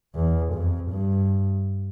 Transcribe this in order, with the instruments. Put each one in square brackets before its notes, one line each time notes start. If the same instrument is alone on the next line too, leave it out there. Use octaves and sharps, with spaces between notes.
[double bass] E2
F2
G2